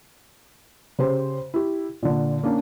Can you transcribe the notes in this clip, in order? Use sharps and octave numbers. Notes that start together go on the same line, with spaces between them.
C#3 G4 C5
E4 G4
A#2 D3
A#3 C#4 D4